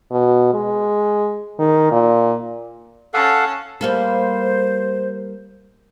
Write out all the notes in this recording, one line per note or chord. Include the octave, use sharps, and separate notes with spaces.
B2
G#3
D#3
A#2
C#4 A4 F5 F#5 A5
G3 A#3 A4 C5